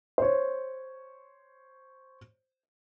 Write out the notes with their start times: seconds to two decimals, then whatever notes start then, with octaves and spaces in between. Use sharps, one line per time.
0.18 C5 C#5